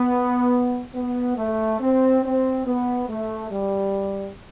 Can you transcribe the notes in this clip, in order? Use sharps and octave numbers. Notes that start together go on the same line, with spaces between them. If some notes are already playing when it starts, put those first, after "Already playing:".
Already playing: B3
B3
A3
C4
C4
B3
A3
G3